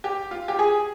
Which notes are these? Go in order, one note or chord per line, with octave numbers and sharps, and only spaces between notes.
G4
F4
G4
G#4